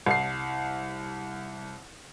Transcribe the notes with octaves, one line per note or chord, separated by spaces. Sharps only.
C2 C7